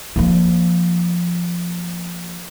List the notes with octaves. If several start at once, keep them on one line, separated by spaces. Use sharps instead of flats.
F3 A#3